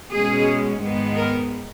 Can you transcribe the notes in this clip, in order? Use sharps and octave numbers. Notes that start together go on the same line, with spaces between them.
B2 G#3 C#4 G#4
G#2 D#3 G#3 B3
A#4